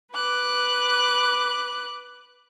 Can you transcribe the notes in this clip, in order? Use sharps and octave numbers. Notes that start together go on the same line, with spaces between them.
B4 D6 F#6